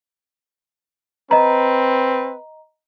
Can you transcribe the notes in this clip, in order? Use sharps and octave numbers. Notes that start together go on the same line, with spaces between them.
C4 B4 D#5 A#5